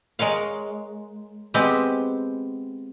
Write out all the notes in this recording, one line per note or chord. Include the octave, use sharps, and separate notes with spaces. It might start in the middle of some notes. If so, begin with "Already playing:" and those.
G#3 A#4 C#5 F5
G#3 B3 C4 G4